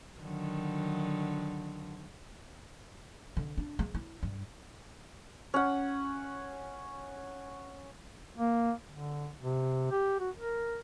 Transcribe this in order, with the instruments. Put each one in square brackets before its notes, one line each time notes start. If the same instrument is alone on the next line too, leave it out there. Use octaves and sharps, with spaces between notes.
[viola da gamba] D3 D#3 F#3
[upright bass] D3
D4
G#3
E4
G2
[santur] C#4 F#5
[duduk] A#3
D3
C3
G4
F#4
A#4